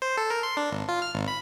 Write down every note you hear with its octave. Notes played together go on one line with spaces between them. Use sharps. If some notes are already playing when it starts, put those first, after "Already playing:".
C5
A4
A#4
C6
D4
G#1
F4
F6
G#1
B5